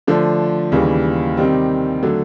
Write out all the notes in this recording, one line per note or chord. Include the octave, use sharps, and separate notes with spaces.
D3 F3 A3 D4
D#2 C#3 E3 G3
C3 D#3 G3 C4
D3 F#3 A3